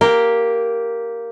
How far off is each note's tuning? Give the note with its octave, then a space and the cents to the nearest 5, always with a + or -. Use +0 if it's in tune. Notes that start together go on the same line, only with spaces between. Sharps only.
A#3 +0 G4 +0 A#4 +0